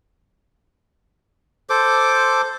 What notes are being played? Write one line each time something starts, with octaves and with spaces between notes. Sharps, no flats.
A4 C5 D6